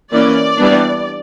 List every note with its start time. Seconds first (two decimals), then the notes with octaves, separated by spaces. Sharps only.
0.11 E3 A#3 C#4 D5
0.57 E3 G3 B3 D4